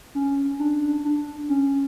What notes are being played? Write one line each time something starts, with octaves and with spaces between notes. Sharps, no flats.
C#4
D4
D4
C#4